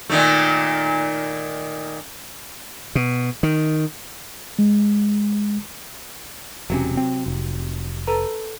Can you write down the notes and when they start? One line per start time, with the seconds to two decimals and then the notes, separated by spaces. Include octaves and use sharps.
0.09 A#2 D#3 A3
2.95 B2
3.43 D#3
4.59 G#3
6.70 E1 C3 F#3 C#4
6.97 C4
7.26 F1
8.07 A4 B4 A#5